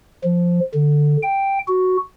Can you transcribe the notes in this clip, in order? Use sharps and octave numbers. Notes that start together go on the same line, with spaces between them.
F3
D3
G5
F#4